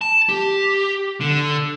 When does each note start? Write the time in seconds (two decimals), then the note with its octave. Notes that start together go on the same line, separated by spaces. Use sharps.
0.01 A5
0.29 G4
1.21 D3